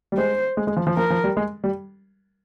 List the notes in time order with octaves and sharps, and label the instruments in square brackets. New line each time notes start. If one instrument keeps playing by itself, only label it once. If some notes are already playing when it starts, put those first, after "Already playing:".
[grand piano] G3
[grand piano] G#3 [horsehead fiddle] C5
[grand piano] G#3
G#3
F3
F3
[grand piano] F3 [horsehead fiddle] A#4
[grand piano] F3
G3
G#3
G3